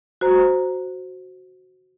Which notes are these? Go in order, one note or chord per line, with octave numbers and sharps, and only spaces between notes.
F#4 C5 A#5